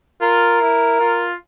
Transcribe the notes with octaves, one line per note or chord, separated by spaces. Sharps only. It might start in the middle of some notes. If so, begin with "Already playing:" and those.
F4 A#4
E4
F4